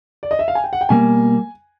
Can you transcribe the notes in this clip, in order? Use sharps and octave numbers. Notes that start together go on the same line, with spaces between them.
D5
D#5
E5
F5
G#5
G5
F#5
G5
B2 G3 A#3 G#5